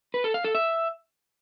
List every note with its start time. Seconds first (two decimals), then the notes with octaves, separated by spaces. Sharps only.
0.14 B4
0.24 A4
0.34 F5
0.44 A4
0.55 E5